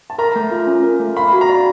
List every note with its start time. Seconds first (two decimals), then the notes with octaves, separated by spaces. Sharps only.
0.10 A5
0.18 A#4 A#5
0.36 A3
0.51 F4
0.67 C#4
0.83 A#4
1.00 A3
1.16 F5 B5
1.33 F#4
1.41 A#5
1.49 D5